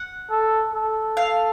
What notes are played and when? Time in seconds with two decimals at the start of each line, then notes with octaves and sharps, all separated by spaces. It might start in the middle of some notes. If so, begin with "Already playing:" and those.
Already playing: F#5
0.30 A4
0.73 A4
1.17 F5